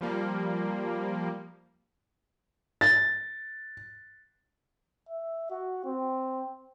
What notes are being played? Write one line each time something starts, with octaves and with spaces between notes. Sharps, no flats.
F3 G3 A#3
A6
E5
F#4
C4